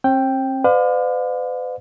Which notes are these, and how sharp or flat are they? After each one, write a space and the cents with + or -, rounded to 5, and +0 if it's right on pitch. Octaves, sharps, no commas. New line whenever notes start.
C4 +40 G5 +0
B4 +45 D5 +30 F5 +35